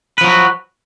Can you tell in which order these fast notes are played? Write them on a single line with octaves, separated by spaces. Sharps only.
B4 F3 F#3 F#4